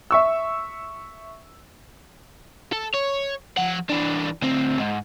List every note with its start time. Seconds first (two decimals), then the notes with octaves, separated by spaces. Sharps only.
0.11 E5 C#6 E6
2.73 A4
2.94 C#5
3.57 F3 F#5
3.90 E3 D4
4.42 D2 C4
4.79 G#2